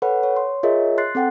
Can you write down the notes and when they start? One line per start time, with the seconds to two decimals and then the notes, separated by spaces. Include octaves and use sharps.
0.02 A4 B4 C#5 F#5 B5
0.23 C#5
0.36 C6
0.63 F4 G#4 A#4 C#5 D#5 E5
0.98 C6 F#6 A6 C7
1.15 C4 A4 F#5 G5